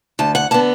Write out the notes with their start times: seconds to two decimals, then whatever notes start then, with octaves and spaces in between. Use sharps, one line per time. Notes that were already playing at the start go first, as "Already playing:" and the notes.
0.19 D2 A5
0.35 F#5
0.51 D3 B3 A5